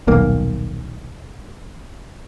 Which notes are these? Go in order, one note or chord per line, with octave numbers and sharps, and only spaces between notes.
D#1 B1 A#3